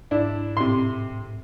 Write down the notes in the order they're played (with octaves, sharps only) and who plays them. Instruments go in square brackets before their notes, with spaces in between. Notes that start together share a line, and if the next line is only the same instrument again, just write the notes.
[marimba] G#2 [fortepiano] D4 E4
[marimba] A2 [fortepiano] C3 C6